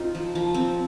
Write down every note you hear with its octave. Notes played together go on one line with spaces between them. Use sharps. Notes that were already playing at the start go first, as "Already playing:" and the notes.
Already playing: C4 D#4 F4
F3
F3
C4